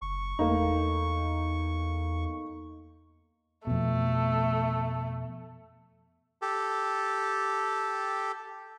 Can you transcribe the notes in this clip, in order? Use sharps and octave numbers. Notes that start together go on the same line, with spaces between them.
F#1 C#6
E2 A3 A#3 D#4
F2 B2 A3
G4 A4